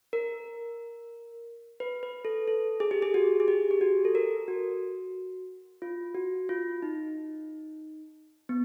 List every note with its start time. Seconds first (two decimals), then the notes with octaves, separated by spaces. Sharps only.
0.13 A#4
1.80 B4
2.03 B4
2.25 A4
2.48 A4
2.80 G#4
2.91 G4
3.02 G#4
3.14 F#4
3.40 G#4
3.48 G4
3.71 G4
3.81 F#4
4.05 A4
4.15 A#4
4.48 F#4
5.82 F4
6.15 F#4
6.49 F4
6.82 D#4
8.49 B3